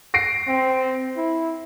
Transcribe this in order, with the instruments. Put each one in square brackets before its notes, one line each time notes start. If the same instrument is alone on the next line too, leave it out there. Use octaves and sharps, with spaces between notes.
[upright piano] A#6 C7 D7
[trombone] C4
E4